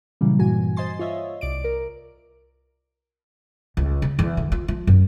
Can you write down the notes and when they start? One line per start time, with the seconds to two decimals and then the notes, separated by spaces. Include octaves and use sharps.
0.21 A#2 C#3 E3 F#3 G3
0.39 G2 A#2 E3 F#4 G#5
0.76 C5 D#5 G#5 C6 A6
0.99 F4 C#5 D#5 E5
1.41 C2 D5 D7
1.64 A#4
3.77 C#2
4.02 C#3
4.19 E2
4.37 D3
4.52 F4
4.68 F3
4.87 F#2